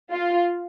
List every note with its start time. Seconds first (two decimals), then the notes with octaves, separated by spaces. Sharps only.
0.13 F4